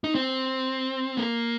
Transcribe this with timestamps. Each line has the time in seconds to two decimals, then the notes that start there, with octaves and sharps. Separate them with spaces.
0.04 D#4
0.15 C4
1.17 A#3